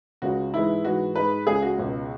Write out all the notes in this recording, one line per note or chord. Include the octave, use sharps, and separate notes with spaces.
C#2 C#3 G#3 F#4
G#2 E3 G#3 E4
G#2 E3 G#3 F#4
G#2 G#3 B4
C#2 C#3 G#3 G#4
F#4
C#2 B2 F#3